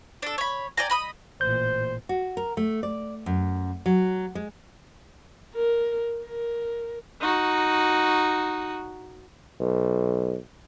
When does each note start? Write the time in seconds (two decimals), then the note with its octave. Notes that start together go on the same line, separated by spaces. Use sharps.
0.22 D4 A4
0.38 C#5 B5
0.77 D5 G5 G#5 A#5
0.90 D#5 B5 D#6
1.41 A1 A#2 C5 G6
2.09 F#4
2.37 A#4
2.57 A3
2.83 D5
3.26 F#2
3.86 F#3
4.35 G#3
5.54 A#4
6.24 A#4
7.20 D#4 F#4
9.60 B1